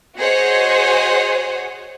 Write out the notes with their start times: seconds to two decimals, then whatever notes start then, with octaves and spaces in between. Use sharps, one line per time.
0.18 F#4 G#4 C5 C#5 D#5 F#5